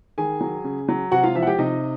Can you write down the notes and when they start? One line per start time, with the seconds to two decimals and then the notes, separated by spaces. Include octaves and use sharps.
0.18 D#3 G#4 G#5
0.41 F#3
0.64 C#3
0.88 F#3
1.11 C3 F#4 F#5
1.23 F4 F5
1.35 F3 E4 E5
1.42 F#5
1.47 G4 G5
1.58 C3 D#4 D#5